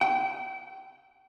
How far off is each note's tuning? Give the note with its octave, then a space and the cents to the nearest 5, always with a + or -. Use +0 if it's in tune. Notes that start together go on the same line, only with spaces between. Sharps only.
G5 -35